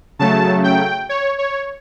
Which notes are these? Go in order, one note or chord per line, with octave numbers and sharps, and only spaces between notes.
C#3 F#3 A3 A5
G5
C#5
C#5